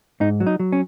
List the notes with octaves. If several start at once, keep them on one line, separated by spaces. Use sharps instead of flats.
G#2 D#4
F#3
D#4
F#3
C#4